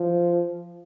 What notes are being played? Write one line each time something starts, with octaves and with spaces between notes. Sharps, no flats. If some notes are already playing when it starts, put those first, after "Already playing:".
Already playing: F3